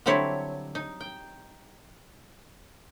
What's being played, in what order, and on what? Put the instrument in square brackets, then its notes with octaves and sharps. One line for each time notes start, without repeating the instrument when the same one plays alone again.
[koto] D3 F#3 G3 C4 E4 C#5
D#4
G5